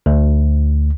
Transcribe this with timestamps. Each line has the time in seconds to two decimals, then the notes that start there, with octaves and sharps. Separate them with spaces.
0.06 D2